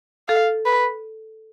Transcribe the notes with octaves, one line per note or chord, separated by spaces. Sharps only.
A4 F5
B4